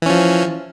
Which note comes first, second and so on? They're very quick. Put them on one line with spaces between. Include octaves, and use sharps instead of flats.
E3 C#4 F3